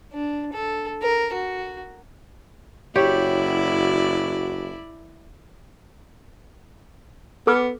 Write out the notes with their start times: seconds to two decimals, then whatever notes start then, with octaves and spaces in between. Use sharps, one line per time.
0.13 D4
0.53 A4
1.02 A#4
1.33 F#4
2.96 F#1 E4 F#4 G4 C#5 D5
7.47 B3 A4 D6 F6